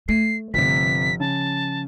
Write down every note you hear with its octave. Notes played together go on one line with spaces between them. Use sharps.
A3 C7
G1 C3 F3 B6
C#3 A5